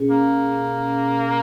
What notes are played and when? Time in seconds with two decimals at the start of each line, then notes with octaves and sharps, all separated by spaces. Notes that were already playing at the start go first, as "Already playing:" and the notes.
Already playing: B2 C#4 G#4
0.11 A#3